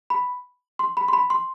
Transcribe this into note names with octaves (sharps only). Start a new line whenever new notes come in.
B5
C6
B5
C6
B5
C6